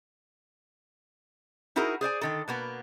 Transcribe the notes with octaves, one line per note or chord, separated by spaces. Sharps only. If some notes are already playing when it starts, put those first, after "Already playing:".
D#4 E4 F#4 G#4 A#4
G#4 C5 D5 G#5
D3 D#3 A4
B2 A#3 B3